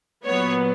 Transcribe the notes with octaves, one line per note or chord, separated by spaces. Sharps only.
A#2 F#3 B3 C#5